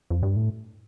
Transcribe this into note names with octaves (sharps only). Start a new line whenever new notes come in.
F2
G2
A2